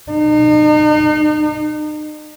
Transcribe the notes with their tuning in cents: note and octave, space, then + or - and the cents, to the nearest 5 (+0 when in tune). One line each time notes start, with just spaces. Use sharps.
D#4 -40